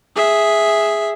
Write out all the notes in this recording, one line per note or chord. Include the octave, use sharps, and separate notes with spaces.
G#4 E5